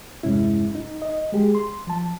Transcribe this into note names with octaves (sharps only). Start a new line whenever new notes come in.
E2 G2 C3 G#3 C#4 E4
D#4
D#5
G#3 G4 G#4
C6
F3 A5